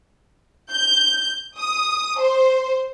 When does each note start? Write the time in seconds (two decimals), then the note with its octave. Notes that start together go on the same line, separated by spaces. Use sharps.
0.70 G6
1.58 D#6
2.19 C5